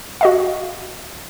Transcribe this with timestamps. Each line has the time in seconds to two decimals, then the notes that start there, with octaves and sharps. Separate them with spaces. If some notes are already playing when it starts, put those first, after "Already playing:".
0.21 F#4 D#5 F5